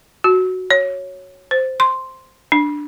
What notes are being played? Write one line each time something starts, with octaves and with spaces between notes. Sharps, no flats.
F#4
C#5
C5
C6
D4